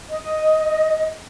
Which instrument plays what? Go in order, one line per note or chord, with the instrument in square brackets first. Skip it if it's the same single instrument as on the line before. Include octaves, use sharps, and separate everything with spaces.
[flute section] D#5